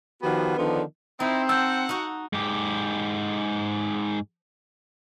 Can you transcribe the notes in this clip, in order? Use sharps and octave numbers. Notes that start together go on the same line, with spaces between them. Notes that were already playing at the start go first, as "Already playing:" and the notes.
D#3 F3 B3 F#4 G4
D3 D#3 F3 B3 D4
C4 D#4 E4
F#5 A5 E6 G6
D#4 F#4
G#2 G4